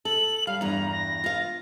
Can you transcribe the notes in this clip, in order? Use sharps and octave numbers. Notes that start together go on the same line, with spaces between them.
A4 F#7
G3 F5
E2 G2 A#5
A#6
F4 F5